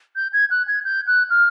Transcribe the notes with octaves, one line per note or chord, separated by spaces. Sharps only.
G6
G#6
F#6
G#6
G6
F#6
F6